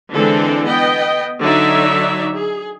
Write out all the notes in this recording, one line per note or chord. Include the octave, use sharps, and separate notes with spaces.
D3 E3 G#3 C4 D4 A4
B3 D#5 G5
D3 F#3 D#4 C#5 D5 E5
G#4